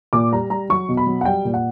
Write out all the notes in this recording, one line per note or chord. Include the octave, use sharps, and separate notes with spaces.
A#2 D6
G3 A#5
G3 A#5
F#3 C#6
B2
B5
F#3
F#5
G3 G5
A#2
F#5